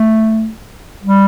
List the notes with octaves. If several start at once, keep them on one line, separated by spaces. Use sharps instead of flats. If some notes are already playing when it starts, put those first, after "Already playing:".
Already playing: A3
G3